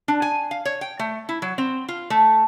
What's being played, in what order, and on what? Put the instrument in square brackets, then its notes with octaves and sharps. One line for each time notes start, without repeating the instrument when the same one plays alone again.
[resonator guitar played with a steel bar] D4
G#5
F5
C#5
G5
A3
E4
F#3
C4
F4
A3